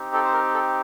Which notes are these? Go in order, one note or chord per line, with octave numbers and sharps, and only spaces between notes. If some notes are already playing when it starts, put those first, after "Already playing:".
Already playing: C4 D#4 G4
A4
C5
A#4
A4